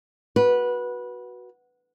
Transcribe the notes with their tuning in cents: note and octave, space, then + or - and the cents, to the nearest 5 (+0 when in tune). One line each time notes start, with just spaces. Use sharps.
F#4 +0 B4 -15